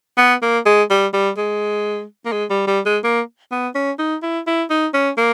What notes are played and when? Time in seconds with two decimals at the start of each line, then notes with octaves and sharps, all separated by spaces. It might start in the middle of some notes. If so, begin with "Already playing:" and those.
0.18 B3
0.43 A#3
0.66 G#3
0.90 G3
1.14 G3
1.38 G#3
2.26 A#3
2.33 G#3
2.50 G3
2.68 G3
2.86 G#3
3.04 A#3
3.51 B3
3.75 C#4
3.99 D#4
4.23 E4
4.47 E4
4.70 D#4
4.94 C#4
5.17 A#3